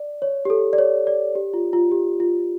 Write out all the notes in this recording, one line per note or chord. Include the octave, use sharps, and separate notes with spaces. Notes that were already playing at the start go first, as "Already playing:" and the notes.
Already playing: D5
C#5
G4
A4
D5
C#5
D5
G4
F4
F4
G4
F4